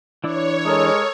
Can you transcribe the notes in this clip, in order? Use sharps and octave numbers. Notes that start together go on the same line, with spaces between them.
E3 D4 E4 C#5
G#3 A4 A#4 D#6